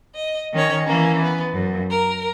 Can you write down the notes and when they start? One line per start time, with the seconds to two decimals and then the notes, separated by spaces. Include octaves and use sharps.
0.15 D#5
0.53 D#3 C#4 C#5
0.86 E3 A#3 C#4
1.22 B3
1.53 F#2
1.89 A#4